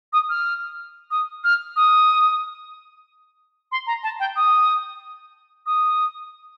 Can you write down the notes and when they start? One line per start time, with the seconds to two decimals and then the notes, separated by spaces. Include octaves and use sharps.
0.13 D#6
0.29 F6
1.11 D#6
1.44 F6
1.76 D#6
3.72 C6
3.87 A#5
4.03 A5
4.20 G5
4.36 D#6
5.66 D#6